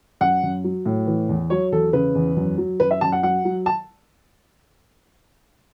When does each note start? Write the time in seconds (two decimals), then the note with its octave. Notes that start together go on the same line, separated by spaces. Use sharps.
0.21 F#2 F#5
0.43 F#2
0.64 F#3
0.86 A2
1.07 E3
1.29 E2
1.50 F#3 C#5
1.72 E2 A4
1.93 C#3 B4
2.15 E2
2.37 F#2
2.58 F#3
2.80 F#2 B4
2.91 E5
3.01 F#2 A5
3.12 F#5
3.23 F#3 F#5
3.45 F#3
3.66 A5